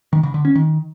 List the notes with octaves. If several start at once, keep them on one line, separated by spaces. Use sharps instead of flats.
D#3
C#3
D3
C#4
D#3